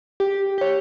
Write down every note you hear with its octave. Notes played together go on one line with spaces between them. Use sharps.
G4
G4 C#5